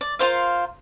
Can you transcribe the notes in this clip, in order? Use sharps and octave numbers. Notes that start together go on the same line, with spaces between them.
D5
F4 A#4 C5 F5